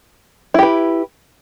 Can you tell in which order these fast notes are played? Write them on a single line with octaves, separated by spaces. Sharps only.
E4 G4 B4